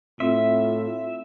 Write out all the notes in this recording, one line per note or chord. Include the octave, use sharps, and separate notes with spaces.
A2 C4 F4 E5